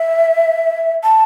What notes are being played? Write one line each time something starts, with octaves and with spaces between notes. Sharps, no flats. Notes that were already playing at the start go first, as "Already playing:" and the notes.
Already playing: E5
A5